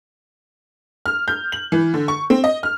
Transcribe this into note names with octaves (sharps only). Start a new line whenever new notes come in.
F6
G6
F#7
E3
D3
C#6
C4
D#5
F6